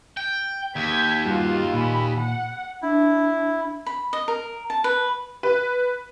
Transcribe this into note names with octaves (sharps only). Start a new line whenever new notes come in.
G5
D#2 G6 G#6 B6
G2 G3 F4 F#4
A#2 G#5 B5
F#5
D4 E4
B5
D#5
A#4
A5
B4
B4